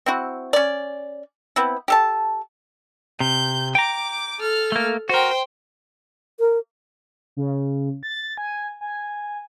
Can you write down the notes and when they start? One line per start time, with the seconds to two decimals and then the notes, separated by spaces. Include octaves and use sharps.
0.06 C4 E4 F#4
0.53 C#4 D5
1.56 B3 C4 E4
1.88 G4 A4 A5
3.20 C3 G6
3.75 G5 A#5 D6
4.40 A4 F6
4.72 A3 A#3
5.09 F#4 A#4 C5 G5
6.39 A#4
7.37 C#3
8.03 A6
8.38 G#5
8.81 G#5